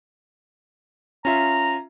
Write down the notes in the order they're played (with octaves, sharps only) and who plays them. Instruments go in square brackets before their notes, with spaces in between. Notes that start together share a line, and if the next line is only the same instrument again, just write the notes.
[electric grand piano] C#4 F4 E5 [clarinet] A#5